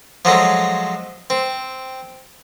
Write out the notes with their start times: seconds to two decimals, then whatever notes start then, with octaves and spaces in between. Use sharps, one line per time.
0.25 F3 F#3 G#3 A3
1.30 C4